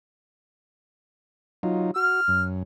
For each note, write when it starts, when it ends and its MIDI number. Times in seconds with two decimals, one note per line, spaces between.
1.63 1.91 54
1.63 1.91 63
1.63 1.91 65
1.96 2.21 66
1.96 2.43 89
2.28 2.63 42